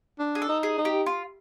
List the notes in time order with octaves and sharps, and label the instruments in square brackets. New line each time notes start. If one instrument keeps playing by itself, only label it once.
[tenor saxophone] D4
[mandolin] G#4
A4
[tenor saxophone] D#4
[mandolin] G#4
[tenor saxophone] D#4
[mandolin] G4
F4